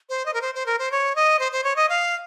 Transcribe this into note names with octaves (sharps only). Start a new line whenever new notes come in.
C5
D#5
A#4
C5
C5
A#4
C5
C#5
D#5
C5
C5
C#5
D#5
F5